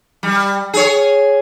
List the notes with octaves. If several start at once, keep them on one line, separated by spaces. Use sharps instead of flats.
G3
G#4 C#5